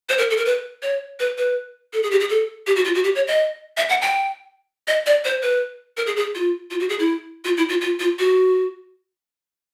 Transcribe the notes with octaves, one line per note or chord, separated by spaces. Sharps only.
C5
A#4
A4
A#4
B4
C#5
B4
B4
A4
G#4
G4
G#4
A4
G4
F#4
F4
F#4
G4
C#5
D#5
E5
F#5
G5
D#5
D5
C5
B4
A#4
G#4
G#4
F4
F4
F#4
G#4
E4
F4
E4
F4
F4
F4
F#4